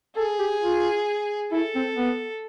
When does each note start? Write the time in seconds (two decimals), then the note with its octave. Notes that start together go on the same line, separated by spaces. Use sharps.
0.16 G#4 A4
0.39 G4
0.62 F4
1.51 E4 A4
1.75 C4
1.96 B3